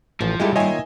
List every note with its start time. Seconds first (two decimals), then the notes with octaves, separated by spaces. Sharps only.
0.21 A1 A2 F3
0.40 G2 G#3 E4 F4 G4 A4 D5
0.56 D#3 A#3 F4 C#5 D#5 E5 G#5